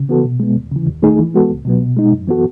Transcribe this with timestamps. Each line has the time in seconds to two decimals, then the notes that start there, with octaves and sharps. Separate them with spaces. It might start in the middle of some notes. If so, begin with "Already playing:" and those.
Already playing: C#3
0.09 E3 B3 F#4 A4
0.24 B2
0.40 G#3 B3
0.56 D#2
0.71 C#3 E3
0.87 D#2
1.02 D#3 A3 D#4 G#4
1.19 E3
1.34 G#3 B3 F#4 A4
1.50 C#2
1.65 B2 F#3 B3
1.81 B2
1.97 G#3 D#4
2.12 F#2
2.28 E3 B3 F#4 A4